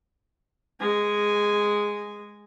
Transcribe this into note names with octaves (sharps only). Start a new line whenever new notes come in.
G#3 G#5